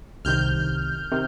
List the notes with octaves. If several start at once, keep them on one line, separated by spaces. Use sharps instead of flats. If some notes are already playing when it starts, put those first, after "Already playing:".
C2 C3 D#3 F6 G6
C3 D#3